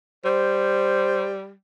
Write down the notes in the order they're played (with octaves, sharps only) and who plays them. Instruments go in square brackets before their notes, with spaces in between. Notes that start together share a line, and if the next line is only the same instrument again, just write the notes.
[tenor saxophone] G3 [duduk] C5